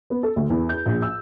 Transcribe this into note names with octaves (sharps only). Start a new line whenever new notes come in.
B3
A4
D2
E2
G6
A#1
E6